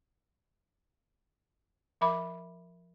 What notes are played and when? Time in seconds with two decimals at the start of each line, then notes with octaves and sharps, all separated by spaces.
2.01 F3 A#4 E5 B5 D6